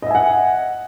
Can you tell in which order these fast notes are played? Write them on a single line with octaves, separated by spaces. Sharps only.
D#5 E5 G#5 F#5